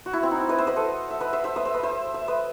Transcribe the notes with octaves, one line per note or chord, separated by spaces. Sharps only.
F#4
E4
C4
D#4
E4
B4 D#5
C5 E5
B4 D#5
A4 C5
E5
B4 D#5
C5 E5
C5 E5
B4 D#5
C5 E5
B4 D#5
C5 E5
E5
B4 D#5